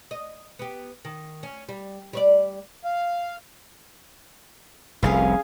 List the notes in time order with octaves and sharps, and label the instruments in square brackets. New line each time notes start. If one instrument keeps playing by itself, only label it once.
[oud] D#5
B3 G4
D#3
C#4
G3
G3 C#5 D5
[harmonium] F5
[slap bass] F1 C2 [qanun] C#4 G#4 F5